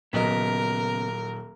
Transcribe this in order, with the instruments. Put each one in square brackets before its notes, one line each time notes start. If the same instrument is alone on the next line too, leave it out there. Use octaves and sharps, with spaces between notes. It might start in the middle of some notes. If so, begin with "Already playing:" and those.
[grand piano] D#1 F#3 D#5 [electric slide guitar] C#3 B3 [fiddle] A#4